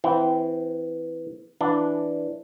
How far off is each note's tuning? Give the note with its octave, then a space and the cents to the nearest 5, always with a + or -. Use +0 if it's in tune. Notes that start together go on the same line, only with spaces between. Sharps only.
E3 +0 C4 -20 E4 +0
E3 +0 D4 +0